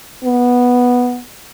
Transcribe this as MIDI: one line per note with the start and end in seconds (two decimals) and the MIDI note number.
0.24 1.20 59